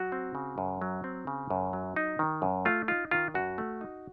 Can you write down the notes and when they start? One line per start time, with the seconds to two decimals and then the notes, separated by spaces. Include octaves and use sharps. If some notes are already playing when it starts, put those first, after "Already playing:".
Already playing: F#3 F#4
0.12 C4
0.35 C#3
0.58 F#2
0.82 F#3
1.04 C4
1.27 C#3
1.50 F#2
1.73 F#3
1.96 D#4
2.19 D#3
2.42 F#2
2.65 A3 F4
2.88 D#4 F4
3.11 D#3 F4
3.34 F#2 F#4
3.58 A3
3.81 D#4